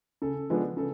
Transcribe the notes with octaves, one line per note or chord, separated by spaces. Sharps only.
C#3 A4
F3 G#3 B3 D4
C#3 A4